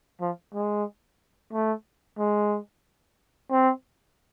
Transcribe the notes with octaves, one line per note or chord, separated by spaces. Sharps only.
F3
G#3
A3
G#3
C4